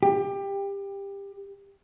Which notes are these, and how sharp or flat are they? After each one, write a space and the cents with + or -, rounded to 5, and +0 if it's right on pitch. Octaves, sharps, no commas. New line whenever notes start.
G4 +20